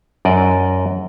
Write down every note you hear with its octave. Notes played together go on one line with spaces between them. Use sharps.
F#2 D5 D#5